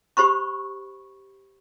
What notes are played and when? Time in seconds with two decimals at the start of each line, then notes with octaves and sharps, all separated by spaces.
0.17 G4 C5 B5 C#6